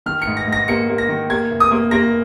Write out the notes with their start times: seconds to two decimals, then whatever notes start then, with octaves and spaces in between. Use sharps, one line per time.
0.06 D#3 F6
0.22 C#7
0.27 G#2
0.37 A#6
0.47 G#2
0.52 A#6
0.68 A#3 C#7
0.89 A#3
0.98 A#6
1.09 D#3
1.30 A#3 G#6
1.50 F1
1.60 D#6
1.71 A#3
1.91 A#3 A#6